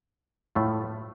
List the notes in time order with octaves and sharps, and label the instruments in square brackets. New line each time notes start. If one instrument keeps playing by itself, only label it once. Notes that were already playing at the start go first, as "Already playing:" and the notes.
[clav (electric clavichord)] A2 A3 F4